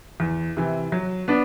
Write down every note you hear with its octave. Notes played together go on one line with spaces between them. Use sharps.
E2
C3 E3
F#3
B3 D4